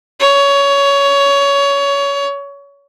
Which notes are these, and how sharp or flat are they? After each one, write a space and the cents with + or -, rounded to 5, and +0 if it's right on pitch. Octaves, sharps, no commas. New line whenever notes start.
C#5 +20